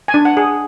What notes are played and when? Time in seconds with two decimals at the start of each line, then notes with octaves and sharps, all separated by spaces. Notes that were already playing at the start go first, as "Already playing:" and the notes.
0.08 G#5
0.14 D4
0.25 F#5
0.37 G#4